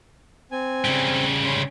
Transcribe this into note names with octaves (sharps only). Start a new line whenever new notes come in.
C4 G#5
C#3 G3
C#4 B5 C6